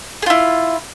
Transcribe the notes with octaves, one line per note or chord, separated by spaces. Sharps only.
E4 F4 G#4